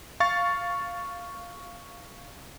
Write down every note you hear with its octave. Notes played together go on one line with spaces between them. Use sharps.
F5 C#6 A6